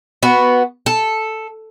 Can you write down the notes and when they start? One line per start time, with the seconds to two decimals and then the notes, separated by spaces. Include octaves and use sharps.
0.23 B3 F#4
0.86 A4